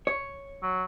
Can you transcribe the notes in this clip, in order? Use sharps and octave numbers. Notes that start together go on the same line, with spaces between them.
C#5
F#3